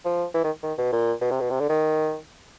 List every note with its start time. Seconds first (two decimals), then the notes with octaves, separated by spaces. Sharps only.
0.05 F3
0.34 E3
0.44 D#3
0.63 D#3
0.78 B2
0.92 A#2
1.21 B2
1.31 C3
1.40 B2
1.50 C3
1.60 D3
1.69 D#3